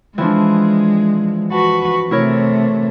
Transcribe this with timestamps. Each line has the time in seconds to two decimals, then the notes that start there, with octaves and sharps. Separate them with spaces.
0.18 E3 F3 G#3 D4
1.52 F#4 B4 A5
2.11 C3 A3 E4 A#4 C#5